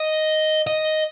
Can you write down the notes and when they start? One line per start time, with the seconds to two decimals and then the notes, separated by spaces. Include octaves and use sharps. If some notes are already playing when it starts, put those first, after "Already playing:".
Already playing: D#5
0.67 D#5